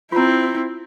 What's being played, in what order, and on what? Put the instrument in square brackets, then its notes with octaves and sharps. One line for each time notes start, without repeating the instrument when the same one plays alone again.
[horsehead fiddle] C4 E4 [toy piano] F4 A#5